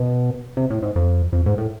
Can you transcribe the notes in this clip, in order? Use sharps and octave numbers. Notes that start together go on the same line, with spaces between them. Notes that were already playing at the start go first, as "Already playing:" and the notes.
Already playing: B2
C3
A2
G#2
F2
F2
G#2
A2